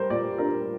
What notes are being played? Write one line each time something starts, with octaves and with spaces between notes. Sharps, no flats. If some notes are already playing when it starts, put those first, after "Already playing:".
Already playing: G3 A#4 C5
A#2 D5
D4 A#4